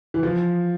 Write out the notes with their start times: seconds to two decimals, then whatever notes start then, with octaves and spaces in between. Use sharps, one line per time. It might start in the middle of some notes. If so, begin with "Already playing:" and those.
0.14 E3
0.23 F3